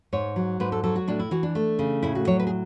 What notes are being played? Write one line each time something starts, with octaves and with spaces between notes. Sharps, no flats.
G#2 C#5
F#3
G#2 B4
A4
F#3 A4
F#4
A2 D4
E4
E3 F#4
D4
A3
C#3
A2 E4
F#4
F#3 C#5
B4
G#4